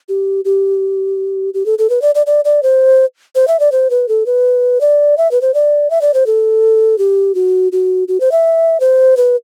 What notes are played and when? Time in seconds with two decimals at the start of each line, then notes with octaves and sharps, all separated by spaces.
0.09 G4
0.45 G4
1.54 G4
1.66 A4
1.79 A4
1.90 B4
2.02 D5
2.15 D5
2.26 D5
2.45 D5
2.63 C5
3.35 C5
3.48 E5
3.59 D5
3.72 C5
3.90 B4
4.08 A4
4.26 B4
4.81 D5
5.17 E5
5.31 B4
5.41 C5
5.54 D5
5.90 E5
6.01 D5
6.14 C5
6.26 A4
6.98 G4
7.35 F#4
7.72 F#4
8.08 F#4
8.20 C5
8.32 E5
8.80 C5
9.17 B4